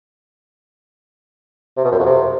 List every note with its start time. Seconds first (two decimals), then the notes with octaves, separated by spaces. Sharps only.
1.77 C3
1.85 B2
1.92 F#2
1.99 F2
2.06 C3